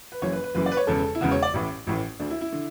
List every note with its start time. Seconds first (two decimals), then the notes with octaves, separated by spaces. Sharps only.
0.12 B4
0.22 F#1 F#2 E3 C#5
0.33 B4
0.44 B4
0.55 F#1 F#2 E3 B4
0.66 D5
0.72 B4
0.77 C#5
0.87 E1 E2 C#3 A4
1.15 E4
1.21 E1 E2 C#3 F#4
1.31 C#5
1.42 D5
1.54 A1 A2 E3
1.87 A1 A2 E3
2.19 D2 D3 D4
2.30 E4
2.41 E4
2.52 D3